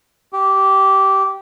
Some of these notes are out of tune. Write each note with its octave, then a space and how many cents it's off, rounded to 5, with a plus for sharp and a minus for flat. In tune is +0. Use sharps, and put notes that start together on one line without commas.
G4 -15